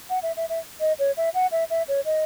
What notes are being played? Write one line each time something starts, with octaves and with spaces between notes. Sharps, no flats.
F#5
E5
E5
E5
D#5
C#5
E5
F#5
E5
E5
C#5
D#5